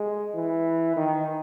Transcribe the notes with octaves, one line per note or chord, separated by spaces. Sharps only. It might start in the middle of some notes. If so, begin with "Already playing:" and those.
Already playing: G#3
E3
D#3